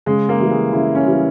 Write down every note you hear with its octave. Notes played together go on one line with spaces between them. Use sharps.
C#3 G#3
A#3
E3 G3
G#3
C#3 E4
C#4
E3 G3